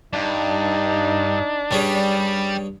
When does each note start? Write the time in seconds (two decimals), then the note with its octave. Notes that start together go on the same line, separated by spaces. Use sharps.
0.13 G2 D4 D#4
1.71 G2 G3 C#4 G#4